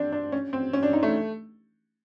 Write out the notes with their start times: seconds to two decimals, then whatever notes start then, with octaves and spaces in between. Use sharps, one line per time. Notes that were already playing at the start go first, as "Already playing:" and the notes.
Already playing: C4 D4
0.12 D4
0.32 C#4
0.53 C4
0.73 C#4
0.83 D4
0.93 D#4
1.03 A3